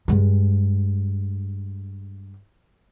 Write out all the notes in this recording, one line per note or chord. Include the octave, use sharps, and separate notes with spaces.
G2 G#3